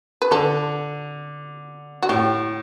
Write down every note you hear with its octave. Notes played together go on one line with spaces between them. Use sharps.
B4
D3 A4
F#4
A2 G4